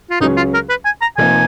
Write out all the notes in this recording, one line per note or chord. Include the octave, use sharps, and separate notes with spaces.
F4
C#2 C#3 F#3 C#4 D#4 G#4
F4
A#4
B4
G#5
A#5
F1 F2 F3 A#3 D#4 G#5